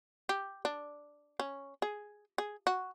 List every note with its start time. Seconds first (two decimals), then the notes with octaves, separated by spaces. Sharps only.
0.29 G4
0.65 D4
1.40 C#4
1.82 G#4
2.38 G#4
2.67 F#4